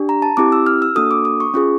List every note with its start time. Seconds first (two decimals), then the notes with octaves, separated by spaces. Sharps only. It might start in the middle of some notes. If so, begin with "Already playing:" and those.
Already playing: D4 G4
0.09 A#5
0.22 A5
0.37 C4 E4 G4 D6
0.52 E6
0.66 F6
0.82 E6
0.95 A#3 D4 F#4 A4 D#6
1.11 D6
1.25 D#6
1.40 C#6
1.54 C#4 F4 G#4 C#6